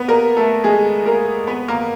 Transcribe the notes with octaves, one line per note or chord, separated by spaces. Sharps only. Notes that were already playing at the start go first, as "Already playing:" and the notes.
Already playing: B3 B4
A#3 A#4
A3 A4
G#3 G#4
A#3 A#4
B3 B4
A#3 A#4